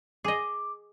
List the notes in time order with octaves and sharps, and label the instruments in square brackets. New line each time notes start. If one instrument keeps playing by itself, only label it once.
[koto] G#4 D#5 [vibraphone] D6